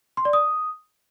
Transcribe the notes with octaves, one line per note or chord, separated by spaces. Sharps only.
C6
D5
D#6